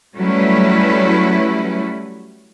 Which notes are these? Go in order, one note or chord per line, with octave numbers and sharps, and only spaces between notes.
F#3 G3 A3 C#4 E4 B4